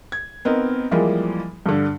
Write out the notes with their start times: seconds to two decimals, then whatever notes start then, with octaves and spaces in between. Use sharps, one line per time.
0.12 G#6
0.45 B3 C4 D#4 A#4
0.91 E3 F3 G3 G#3 A#3
1.66 G2 D3